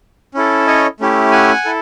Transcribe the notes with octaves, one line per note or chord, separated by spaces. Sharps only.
C#4 E4 A4
C#5 D#5
A3 C#4 E4 G4
F#5 G#5
E4 A4